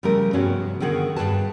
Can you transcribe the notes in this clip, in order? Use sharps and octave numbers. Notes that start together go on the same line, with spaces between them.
C#3 F3 G3 A3 A#4
G2 C3 B3 C#4 F#4 G#4
D3 D#3 B3 F#4 G#4 A#4
G2 C#3 G#4 B4 A5